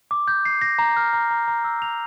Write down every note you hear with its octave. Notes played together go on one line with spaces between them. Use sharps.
D6
G6
C7
A#6
A#5
F6
A#5
A#5
A#5
E6
F7